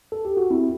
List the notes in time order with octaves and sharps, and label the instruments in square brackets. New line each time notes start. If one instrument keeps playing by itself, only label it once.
[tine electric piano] A4
G4
F#4
C4 E4